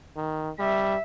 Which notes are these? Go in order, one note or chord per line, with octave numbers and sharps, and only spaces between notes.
D#3
G3 E5